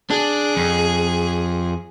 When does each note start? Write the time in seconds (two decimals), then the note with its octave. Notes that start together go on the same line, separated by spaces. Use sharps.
0.10 D4 G#4
0.57 F2